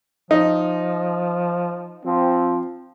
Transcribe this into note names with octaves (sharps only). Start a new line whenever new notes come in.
F3 D#4
F3 C4